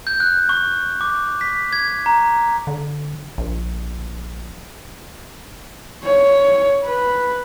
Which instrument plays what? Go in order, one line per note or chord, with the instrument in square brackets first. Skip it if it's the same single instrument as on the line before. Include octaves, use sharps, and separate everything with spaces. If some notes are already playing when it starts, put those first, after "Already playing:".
[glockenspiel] G6
F#6
C#6
D6
B6
G#6
A#5
[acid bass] D3
A#1
[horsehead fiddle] C#5
B4